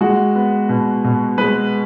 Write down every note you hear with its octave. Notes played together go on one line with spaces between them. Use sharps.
G#3 F#4
B3
B2
B2
G#3 B4